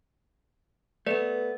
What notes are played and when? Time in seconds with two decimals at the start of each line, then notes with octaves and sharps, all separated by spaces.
1.06 A3 B3 B4 D5